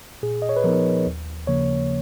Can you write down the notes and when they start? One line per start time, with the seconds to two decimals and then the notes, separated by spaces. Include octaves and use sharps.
0.23 A#2 G#4
0.42 D#5
0.49 C#5
0.56 B4
0.64 F3 B3 D#4 A#4
1.06 D#2
1.47 C#3 F3 A#3 C#5